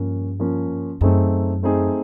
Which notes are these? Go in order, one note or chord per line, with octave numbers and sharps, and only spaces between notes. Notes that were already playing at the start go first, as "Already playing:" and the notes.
Already playing: G2 F3 A#3 C#4
F3 A#3 C#4
F#2 A3 C4 D#4 G#4
A3 C4 D#4 G#4